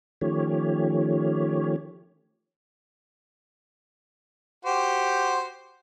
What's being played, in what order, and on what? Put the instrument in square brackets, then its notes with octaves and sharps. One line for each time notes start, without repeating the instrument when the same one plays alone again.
[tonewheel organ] D#3 F3 A3 C#4 G4 C#5
[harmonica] F#4 G4 C5